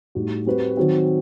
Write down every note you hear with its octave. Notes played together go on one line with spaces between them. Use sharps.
A2 G3 D#4 F#4
G3 C4 F#4 B4
D#3 F#3 C4